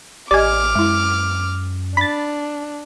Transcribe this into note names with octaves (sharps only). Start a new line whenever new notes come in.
A1 G4 D5 D#5 G#5 D6 F6
F#2 G#3 E4
D4 B5 A6